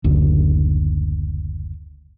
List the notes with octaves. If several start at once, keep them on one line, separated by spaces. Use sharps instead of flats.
F#1 D2